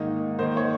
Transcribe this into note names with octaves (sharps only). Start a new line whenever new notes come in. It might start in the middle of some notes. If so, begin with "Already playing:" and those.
Already playing: G#2 D#3 A#3 D#4
D#3 A#3 D#4 C5
C#5